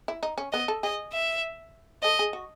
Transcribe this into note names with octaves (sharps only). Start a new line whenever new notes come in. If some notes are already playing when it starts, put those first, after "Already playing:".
E4
D#4
C#4
B3 D#5
A4
G#4 D#5
E5
A4 D#5
G#4
F#4